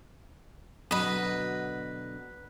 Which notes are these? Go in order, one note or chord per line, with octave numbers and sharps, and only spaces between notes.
B2 D3 F#3 B4 D#5